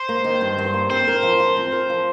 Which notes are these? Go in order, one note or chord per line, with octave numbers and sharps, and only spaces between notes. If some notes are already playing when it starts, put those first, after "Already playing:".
Already playing: C5
A#3
D#3
G2
G2
A#3
C4 C5
A#4
F3
F4
C4
A#4
F3